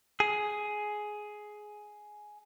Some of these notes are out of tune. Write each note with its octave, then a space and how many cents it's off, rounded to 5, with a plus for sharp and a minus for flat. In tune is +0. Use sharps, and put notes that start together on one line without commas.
G#4 +10